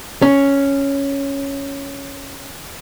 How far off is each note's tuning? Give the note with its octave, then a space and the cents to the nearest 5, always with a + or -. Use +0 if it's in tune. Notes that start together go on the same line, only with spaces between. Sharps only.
C#4 +0